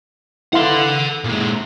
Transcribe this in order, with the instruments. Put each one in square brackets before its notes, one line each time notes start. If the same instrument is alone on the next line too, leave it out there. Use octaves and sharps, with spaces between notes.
[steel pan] E4 F5 C6 [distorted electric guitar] A4 F#5
[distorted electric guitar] A#2 G#3